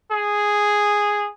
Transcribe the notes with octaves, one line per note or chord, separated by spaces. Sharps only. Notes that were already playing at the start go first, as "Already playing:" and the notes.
G#4